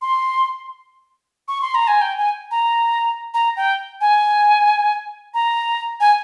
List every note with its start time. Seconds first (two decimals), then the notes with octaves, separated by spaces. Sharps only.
0.02 C6
1.48 C#6
1.62 C6
1.75 A#5
1.88 G#5
2.01 G5
2.18 G#5
2.51 A#5
3.34 A#5
3.57 G5
4.01 G#5
5.34 A#5
6.00 G#5